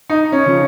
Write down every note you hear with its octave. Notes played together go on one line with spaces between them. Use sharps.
D#4
C#4
C#3 F3